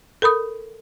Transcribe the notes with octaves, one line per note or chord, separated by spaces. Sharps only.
A4 A#4 B5 D#6